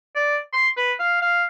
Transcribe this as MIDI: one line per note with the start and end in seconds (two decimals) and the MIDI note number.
0.16 0.38 74
0.53 0.68 84
0.77 0.93 71
0.99 1.20 77
1.22 1.44 77